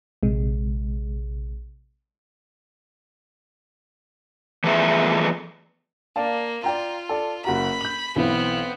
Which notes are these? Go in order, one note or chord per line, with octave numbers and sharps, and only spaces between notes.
A#1 C3 G#3
E3 F3 A3 B3 G#4 E5
A#3 D5 F5 A5
F4 D5 G5 A#5
A4 D5
F#1 F#4 A#5 B5
G6 F#7
B1 E3 B3 C4